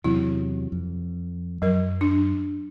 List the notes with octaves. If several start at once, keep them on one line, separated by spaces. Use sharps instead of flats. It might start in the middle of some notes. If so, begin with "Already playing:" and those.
E2 C3 F#3 E4
F2
F#2 F#3 A#4
D4